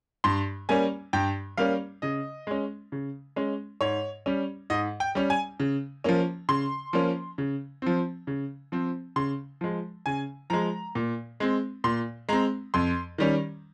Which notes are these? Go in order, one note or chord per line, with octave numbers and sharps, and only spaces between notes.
G2 C6
G3 A#3 C#4 G#5
G2 G5
G3 A#3 C#4 F5
C#3 D#5
G#3 C#4
C#3
G#3 C#4
G#2 C#5
G3 C#4
G#2 D#5
G5
G3 C#4
G#5
C#3
F3 A#3 C#4
C#3 C6
F3 A#3 C#4
C#3
F3 C4
C#3
F3 C4
C#3 C6
F3 G#3
C#3 G#5
F3 G#3 A#5
A#2
G#3 C4
A#2 C6
G#3 C4 A#5
F2 C6
D#3 G3 C#4